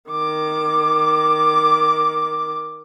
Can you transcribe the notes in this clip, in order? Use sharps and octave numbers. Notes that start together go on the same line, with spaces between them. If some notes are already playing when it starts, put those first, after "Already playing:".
D#3 D6